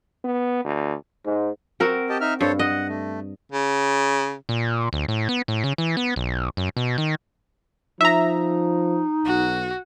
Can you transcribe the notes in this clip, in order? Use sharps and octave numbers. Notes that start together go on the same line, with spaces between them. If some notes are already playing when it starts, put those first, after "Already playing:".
B3
D2
G#2
C4 F#4 A#4
G4 D#5 A5
D#4 E5 F6
G2 A4 C5 C#5
D#5 F#5
A3
C#3
A#2
D2
A2
B3
A2
C#3
E3
B3
B1
F#2
B2
D#3
F3 D#4 E5 A#5
B1 F#4